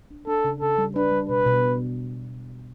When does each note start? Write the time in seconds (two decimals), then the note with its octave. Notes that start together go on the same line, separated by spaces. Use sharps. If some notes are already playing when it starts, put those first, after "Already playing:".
0.11 D4
0.27 D4 A4
0.44 C#3
0.61 C#3 A4
0.78 G3
0.96 D4 B4
1.12 G3
1.29 B2 B4
1.46 B2